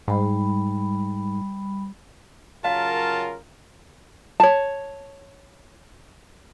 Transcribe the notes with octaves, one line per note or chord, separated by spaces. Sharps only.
G#2 G3 B5
C#3 F#3 F4 A#4 F5 A5
C#5 A5